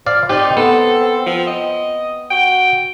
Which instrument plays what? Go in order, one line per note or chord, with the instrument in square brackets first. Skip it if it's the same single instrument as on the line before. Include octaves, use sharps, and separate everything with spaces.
[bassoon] F3 [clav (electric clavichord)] D5 F5
[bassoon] C4 [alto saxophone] D#4 [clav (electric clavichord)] G4 D5
[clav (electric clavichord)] B3 [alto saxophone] A4
[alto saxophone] F3
D#5
[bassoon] F#4 [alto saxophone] G5